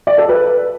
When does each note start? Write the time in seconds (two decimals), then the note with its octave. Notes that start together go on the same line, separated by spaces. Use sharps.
0.07 D5
0.18 A4
0.29 B4